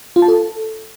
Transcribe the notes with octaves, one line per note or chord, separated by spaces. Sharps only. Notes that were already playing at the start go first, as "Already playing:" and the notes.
F4
A5
A4